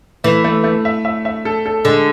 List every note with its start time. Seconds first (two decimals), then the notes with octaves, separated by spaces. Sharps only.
0.24 E3 A3
0.44 A3
0.64 A3
0.85 E5
1.05 E5
1.25 E5
1.45 A4
1.66 A4
1.85 D3 G#3